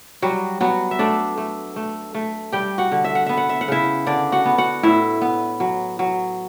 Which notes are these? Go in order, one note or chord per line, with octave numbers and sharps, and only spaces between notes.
F#3 G3 F#4
F#3 B3 F#4
E5
A3 D4 D5
A3
A3
A3
G3 G4 G5
F#4 F#5
D3
E5
F#5
B3 E5
F#5
E5
F#5
C#3 E4 E5
D3 D4 D5
F#4 F#5
B3
F#4 F#5
A2 E4 E5
B3
F#3
F#3